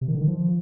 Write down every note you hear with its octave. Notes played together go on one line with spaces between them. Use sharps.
C3
D#3
D3
D#3
F3